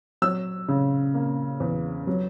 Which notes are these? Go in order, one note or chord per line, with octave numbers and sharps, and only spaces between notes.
F#3 E6
C#3
A#3
E2
F#3